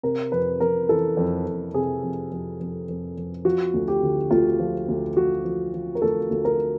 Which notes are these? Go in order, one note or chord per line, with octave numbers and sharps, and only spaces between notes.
C3 A#4
F2 B4
F2 A#4
E3 A4
F2
F2
C3 G#4
F2
F2
F2
F2
F2
F3 F#4
D2
G4
D3
D2 F4
F3
D2
F3 F#4
F3
F3
A#4
D2 A4
D2
A#4